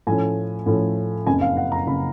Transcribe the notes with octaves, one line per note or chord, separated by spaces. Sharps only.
A2 F3 A3 C#4 G#5
A2 F3 A3 C#4
F#1 F2 C#3 G#5
F5
F#5
A#5
F#1 C#3 B5